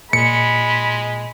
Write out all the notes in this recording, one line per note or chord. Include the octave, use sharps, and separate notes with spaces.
A#2 G#3 B5 C#7